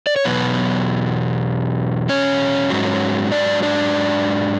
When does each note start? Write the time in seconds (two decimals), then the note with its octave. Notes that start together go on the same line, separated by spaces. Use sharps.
0.07 D5
0.16 C#5
0.25 E2 B2 F#3 B3 B4
2.09 C#4 C#5
2.70 G#2 F#3
3.32 D4 D5
3.63 D4 D5